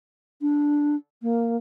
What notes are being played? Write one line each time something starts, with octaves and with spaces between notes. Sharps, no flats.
D4
A#3